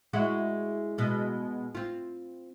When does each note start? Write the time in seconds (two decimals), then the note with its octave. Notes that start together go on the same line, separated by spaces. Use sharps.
0.13 G#3 E4 F#4
0.98 B2 G#3
1.75 C4 F4